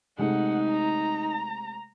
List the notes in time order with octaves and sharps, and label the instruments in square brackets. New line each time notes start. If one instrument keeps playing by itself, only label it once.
[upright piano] C3 G#3 A3 [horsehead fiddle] D#4 [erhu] F#5
[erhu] A#5